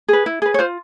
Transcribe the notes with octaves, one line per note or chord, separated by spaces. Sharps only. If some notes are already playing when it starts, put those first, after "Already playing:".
G#4 B4
E4
G#4 B4
C#5
F4 C5